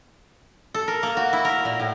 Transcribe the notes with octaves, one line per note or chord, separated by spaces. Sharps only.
A4
A#4
A#3
F#4
E4
A#4
A#2
A2